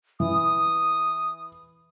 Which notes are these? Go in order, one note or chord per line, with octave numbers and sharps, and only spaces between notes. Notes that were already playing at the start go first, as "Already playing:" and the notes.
E3 D#6